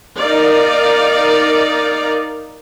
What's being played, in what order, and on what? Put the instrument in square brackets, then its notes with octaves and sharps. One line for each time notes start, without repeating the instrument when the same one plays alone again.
[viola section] D#4 A#4 D5 F5